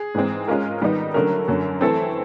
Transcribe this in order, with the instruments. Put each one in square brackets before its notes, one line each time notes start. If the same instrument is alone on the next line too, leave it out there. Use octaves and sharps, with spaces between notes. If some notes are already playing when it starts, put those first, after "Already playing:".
Already playing: [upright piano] G#4
[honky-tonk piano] G#2 E3 G#3 C4
G#3 C#4 F4 A#4
D#3 G3 B3 D#4
[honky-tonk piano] D3 F#3 A3 C#4 [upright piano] A#4
[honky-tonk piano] F#2 D3 F#3
[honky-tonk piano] E3 A3 C4 [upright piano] A4